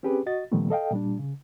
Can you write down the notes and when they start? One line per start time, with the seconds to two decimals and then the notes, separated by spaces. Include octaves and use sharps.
0.03 C4 C#4 G4 G#4 B4
0.26 F#4 D#5 A6
0.52 A#2 D#3 F3 G3 A3 B3
0.70 A4 D#5 F5 G5
0.91 A#2 G3 D4
1.19 C#3